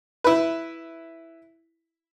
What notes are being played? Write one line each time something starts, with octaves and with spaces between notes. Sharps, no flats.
E4 B4